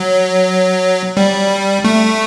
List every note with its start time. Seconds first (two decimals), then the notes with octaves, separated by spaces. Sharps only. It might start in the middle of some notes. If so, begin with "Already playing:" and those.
Already playing: F#3
1.17 G3
1.85 A3